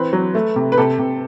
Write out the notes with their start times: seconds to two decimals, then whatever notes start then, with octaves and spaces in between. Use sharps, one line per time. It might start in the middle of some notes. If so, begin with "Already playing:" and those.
Already playing: E3 C4 B4
0.13 F#3
0.35 A3
0.56 C3
0.72 B4
0.78 C3 A4
0.99 C3